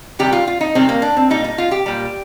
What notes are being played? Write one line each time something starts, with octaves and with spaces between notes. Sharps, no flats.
C3 D#3 G3 G4
F4
F4
D#4
C3 D#3 G3 C4
A#3
D4
C4
A#2 G3 D#4
D#4
F4
G4
A#2 G3